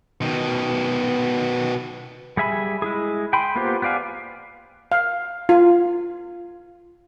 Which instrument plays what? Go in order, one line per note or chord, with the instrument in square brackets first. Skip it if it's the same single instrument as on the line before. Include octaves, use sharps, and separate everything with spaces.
[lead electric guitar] B2 D#3
[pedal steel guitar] G3 G#4 E5 G#5 B5
G#3 E4 G#4
G5 G#5 B5 C6
A#3 B3 F4 G4 C5
B3 G4 D5 F5 G#5
[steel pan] F5
F4